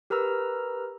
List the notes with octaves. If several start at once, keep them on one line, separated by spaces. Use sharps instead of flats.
G4 A#4 B4 A#5 E6